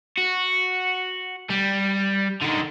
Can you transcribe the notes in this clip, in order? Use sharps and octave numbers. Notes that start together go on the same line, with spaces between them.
F#4
G3
D3 D#3